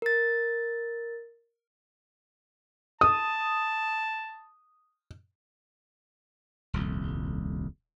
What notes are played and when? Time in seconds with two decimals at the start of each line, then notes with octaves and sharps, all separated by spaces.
0.02 A#4 A6
3.01 A5 D#6
6.73 D#1 C2 F2